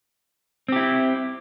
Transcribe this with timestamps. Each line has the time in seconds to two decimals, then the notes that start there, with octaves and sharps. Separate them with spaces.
0.69 C4
0.72 G4
0.76 E4